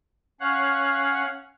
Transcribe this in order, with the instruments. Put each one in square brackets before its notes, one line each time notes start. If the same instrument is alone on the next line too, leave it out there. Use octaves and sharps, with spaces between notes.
[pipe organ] C#4 C#5 F5 F#5